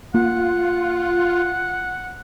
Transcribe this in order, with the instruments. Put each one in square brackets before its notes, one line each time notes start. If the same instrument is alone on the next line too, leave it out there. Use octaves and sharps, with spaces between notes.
[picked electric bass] A#3 [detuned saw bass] F4 [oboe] F#5